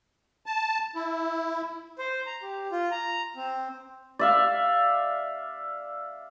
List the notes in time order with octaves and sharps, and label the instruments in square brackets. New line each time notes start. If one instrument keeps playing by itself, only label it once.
[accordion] A5
E4
[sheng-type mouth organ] C5
A#5
G4
F4
A#5
C4
[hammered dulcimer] D5 E5 F5